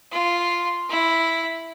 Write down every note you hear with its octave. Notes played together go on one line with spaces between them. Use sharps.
F4
E4